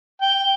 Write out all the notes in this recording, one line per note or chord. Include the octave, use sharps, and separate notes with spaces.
G5